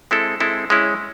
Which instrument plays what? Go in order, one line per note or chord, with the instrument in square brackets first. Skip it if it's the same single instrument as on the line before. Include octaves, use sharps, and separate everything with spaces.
[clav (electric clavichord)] G#3 C4 E4 A4
G#3 C4 E4 A4
G#3 C#4 E4